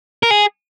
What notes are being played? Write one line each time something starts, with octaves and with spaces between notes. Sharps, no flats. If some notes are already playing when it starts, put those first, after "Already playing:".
A#4
G#4